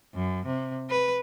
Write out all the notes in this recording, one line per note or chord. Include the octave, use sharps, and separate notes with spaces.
F#2
C3
B4